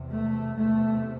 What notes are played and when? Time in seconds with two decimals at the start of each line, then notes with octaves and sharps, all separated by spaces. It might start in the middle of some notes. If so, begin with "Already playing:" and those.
Already playing: E2 C3
0.09 A3
0.56 E2 C3 A3